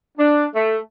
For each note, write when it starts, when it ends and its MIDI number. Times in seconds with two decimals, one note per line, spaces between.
0.18 0.45 62
0.54 0.77 57